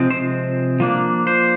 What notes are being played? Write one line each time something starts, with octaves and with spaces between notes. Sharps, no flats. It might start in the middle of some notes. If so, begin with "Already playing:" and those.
Already playing: C3 F3 G#3 C4
C5
F3 A#3 D4
C5